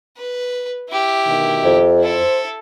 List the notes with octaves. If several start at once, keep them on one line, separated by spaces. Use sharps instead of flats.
B4
E4 G4
D2 B2 D#3
F2
E4 A4 C5